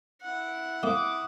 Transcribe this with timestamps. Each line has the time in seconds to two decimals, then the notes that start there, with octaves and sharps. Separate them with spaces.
0.21 E4 F#5
0.83 C3 G3 A#3 D6 D#6